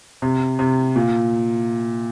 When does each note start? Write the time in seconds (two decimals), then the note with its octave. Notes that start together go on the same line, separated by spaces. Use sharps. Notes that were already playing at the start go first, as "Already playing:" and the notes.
0.22 C3
0.59 C3
0.96 A#2